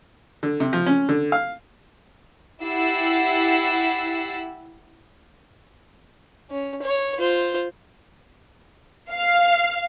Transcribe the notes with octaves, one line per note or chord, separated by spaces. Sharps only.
D3
C3
F3
C#4
D3
F5
E4 G4 F#5 E6 A6 C7
C#4
C#5
F4 C5
F5